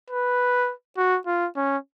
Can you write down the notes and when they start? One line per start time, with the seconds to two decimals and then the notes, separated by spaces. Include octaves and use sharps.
0.10 B4
0.97 F#4
1.27 F4
1.57 C#4